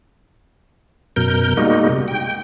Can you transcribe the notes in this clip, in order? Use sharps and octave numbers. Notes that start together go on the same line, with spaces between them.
F#2 B2 A#4 G6
G3 G#3 A#3 D#4 F#4
C3
G5